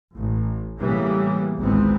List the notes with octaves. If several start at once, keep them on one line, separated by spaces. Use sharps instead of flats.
A1
A2 C#3 E3 G3 A#3 B3
G#1 C#2 E3 B3 C4